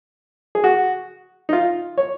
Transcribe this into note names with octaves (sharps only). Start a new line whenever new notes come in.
G#4
F#4
D#4
F4
C#5